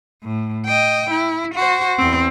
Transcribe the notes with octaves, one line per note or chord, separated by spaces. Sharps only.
A2
D#5 G5
E4
F#4 C5
E2 C4